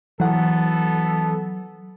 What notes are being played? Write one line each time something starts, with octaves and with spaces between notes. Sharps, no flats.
E3 F#3 B3 A4 F#5